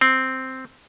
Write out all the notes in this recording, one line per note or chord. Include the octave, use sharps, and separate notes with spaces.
C4